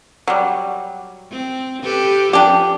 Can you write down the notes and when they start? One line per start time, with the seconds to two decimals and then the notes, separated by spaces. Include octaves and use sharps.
0.28 F#3 G3
1.31 C4
1.83 G4 A4 B4
2.33 F3 D4 G4